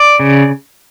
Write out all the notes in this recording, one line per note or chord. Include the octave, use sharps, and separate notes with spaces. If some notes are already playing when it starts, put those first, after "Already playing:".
Already playing: D5
C#3